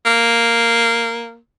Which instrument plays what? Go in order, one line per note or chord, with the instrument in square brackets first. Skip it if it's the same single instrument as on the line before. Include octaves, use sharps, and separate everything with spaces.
[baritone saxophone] A#3